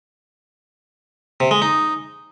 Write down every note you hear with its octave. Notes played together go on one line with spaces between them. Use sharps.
C3
G#3
D#4